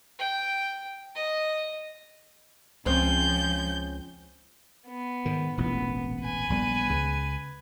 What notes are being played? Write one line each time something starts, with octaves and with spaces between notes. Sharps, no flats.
G5
D#5
C#2 F3 C4 C#4 G6
B3
G#2 D#3
E1 A1 A#2 B3
B4 G#5
A#1 G3 B3
C#2 C#3